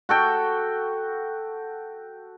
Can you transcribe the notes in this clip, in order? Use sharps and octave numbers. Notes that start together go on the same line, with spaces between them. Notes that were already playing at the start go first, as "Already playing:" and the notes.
F#4 A4 G5